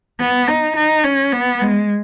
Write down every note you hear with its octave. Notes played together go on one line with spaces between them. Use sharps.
B3
D#4
D#4
C#4
B3
G#3